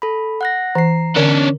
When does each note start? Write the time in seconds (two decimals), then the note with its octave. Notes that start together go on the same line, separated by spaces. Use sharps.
0.02 A4 B5
0.41 F#5 F#6 A#6
0.75 E3 A#5 C7
1.16 D3 C#4 D4